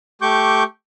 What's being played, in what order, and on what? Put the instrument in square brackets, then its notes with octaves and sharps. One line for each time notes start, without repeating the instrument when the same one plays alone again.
[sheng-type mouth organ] A3 G4 C#6 D6 G6